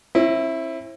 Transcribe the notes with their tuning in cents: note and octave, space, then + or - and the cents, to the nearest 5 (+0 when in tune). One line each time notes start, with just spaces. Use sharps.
C4 +45 E4 +0